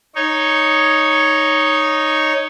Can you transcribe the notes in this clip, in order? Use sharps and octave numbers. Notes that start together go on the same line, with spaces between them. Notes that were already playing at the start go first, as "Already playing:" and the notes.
D#4 C#5